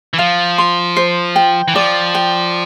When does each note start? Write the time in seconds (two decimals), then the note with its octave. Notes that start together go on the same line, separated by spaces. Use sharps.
0.14 E3
0.19 F3 F5
0.58 C6
0.97 C5
1.36 G5
1.68 E3
1.75 F3 D5
2.15 G5